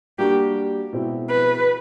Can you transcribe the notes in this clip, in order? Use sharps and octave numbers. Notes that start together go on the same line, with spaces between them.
G3 A#3 D4 F#4 G4
B2 G#3 C4 E4
B4